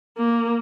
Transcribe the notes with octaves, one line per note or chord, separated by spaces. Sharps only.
A#3